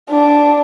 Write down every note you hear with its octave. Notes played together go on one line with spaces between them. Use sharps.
D4